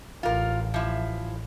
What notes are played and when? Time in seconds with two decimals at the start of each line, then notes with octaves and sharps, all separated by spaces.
0.23 A1 F4 A#4
0.74 F3 E4